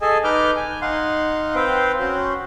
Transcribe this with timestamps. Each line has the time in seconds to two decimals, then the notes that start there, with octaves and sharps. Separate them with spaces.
0.02 G#4 A4 D#5 G#5 A5
0.24 D#4 B4 D6 F6 G6
0.56 G#5
0.82 D#4 F5 F#5 C6
1.55 C4 B4 C5 F5 G5
1.99 C#4 F#4 C5